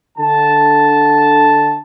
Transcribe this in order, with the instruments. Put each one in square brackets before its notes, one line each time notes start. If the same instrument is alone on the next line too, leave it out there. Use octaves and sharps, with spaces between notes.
[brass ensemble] D3 A5